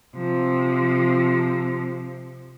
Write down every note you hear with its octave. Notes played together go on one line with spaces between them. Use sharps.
C3 F3